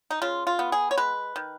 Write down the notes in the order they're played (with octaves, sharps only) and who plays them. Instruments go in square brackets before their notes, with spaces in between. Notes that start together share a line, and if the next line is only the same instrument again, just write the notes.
[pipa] D#4
C#3 F4
F4
B3
G#4
C#5
G#3 B4
D#3